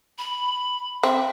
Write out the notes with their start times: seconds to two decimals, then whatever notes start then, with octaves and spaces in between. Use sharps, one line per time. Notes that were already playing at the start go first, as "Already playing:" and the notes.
0.18 B5
1.03 C4 E5